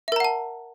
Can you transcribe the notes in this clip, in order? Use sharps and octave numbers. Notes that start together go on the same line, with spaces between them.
A#4 E5 F#5 A5 A#5